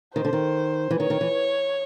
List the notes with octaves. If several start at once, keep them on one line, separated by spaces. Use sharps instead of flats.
D#3 C5
D3
D#3
E3
D#3 C#5
D#3
E3